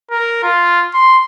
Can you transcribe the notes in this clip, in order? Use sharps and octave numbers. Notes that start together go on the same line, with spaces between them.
A#4
F4
C6